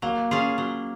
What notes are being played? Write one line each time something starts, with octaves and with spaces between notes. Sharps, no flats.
F#3 A#3
C#4 F4 G#4
F#3